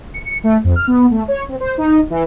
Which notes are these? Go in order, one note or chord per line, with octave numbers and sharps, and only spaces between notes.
C#7
A3
F2
F6
B3
A3
C#5
C4
C5
D#4
E3